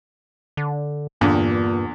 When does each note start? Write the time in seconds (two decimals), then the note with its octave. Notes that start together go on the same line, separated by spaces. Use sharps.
0.57 D3
1.21 E2 G2 A#2 D3